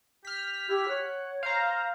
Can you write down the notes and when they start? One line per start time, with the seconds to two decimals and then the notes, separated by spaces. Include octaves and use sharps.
0.25 G4 F6 B6
0.69 E4 G4
0.88 C#5 F#5
1.43 C5 F5 A#5